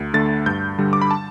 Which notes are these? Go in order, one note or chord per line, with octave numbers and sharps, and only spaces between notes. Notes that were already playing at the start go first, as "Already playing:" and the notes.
Already playing: D2
D3 A3 A6
G2 G6
D3 G3
D6
B5
A5